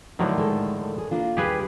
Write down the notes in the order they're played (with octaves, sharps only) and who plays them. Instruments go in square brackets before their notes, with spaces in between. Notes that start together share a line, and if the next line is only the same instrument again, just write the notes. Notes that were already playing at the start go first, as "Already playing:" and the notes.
[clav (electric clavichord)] A2 D3 D#3 [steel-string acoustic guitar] F#3 A#4 C#5
[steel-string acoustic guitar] G#3 A4
G#4
A#3 D4 F4
[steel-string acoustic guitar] D#2 G3 [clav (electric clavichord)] G4 G#4 B4